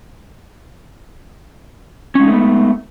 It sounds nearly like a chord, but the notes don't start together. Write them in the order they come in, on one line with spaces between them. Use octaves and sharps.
C#4 G#3 D#4 A3 B3